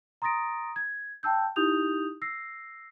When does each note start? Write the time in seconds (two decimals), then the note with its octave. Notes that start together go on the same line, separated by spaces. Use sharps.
0.22 A#5 C6 D#6 A6 A#6 D7
0.76 G#6
1.23 G5 A5 E6 G6
1.56 D#4 E4 G4 D#6 G6 F7
2.22 E6 A#6 C7